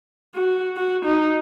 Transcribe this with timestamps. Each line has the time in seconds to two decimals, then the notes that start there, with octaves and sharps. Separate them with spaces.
0.35 F#4
0.77 F#4
1.05 D#4